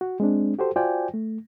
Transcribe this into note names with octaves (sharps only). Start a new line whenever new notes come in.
F#4
G#3 C4 D4
F#4 G4 A4 C5
F4 F#4 C5 D5 G5 G#5
A3